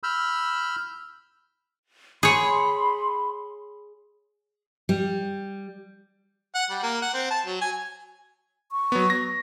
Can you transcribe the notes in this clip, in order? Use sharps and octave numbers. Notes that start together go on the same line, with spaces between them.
B5 E6 F6 G6
G#4 C#5 B5 C6
G3
F#5
G3
A#3
F#5
C4
A5
F#3
G#5
C#6
F#3 B3
A#6